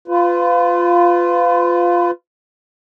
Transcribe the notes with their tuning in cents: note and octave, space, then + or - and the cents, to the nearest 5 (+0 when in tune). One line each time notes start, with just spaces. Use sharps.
F4 +0 B4 +35